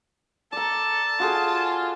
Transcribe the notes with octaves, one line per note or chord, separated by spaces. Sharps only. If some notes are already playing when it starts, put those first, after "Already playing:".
A4 D5 A5 A#5
F4 F#4 G#4 A4